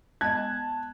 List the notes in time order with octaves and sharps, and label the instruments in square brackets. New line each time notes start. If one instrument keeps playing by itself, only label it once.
[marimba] G#3 B3 D#5 [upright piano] A5 F#6 G#6